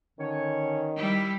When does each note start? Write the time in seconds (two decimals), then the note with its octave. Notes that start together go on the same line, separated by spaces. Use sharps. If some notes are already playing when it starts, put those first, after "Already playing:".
0.19 D3 D#3 C#4 C#5
0.96 G3 E4